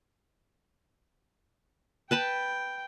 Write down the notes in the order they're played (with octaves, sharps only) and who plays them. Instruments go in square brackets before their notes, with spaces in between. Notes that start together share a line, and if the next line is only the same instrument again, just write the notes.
[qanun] B4 A5 B5 [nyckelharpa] G5